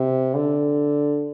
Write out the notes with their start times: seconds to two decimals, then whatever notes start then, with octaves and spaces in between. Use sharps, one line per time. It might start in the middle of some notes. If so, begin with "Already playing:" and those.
Already playing: C3
0.34 D3